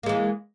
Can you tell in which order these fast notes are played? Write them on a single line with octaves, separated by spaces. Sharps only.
A#3 G#3 E3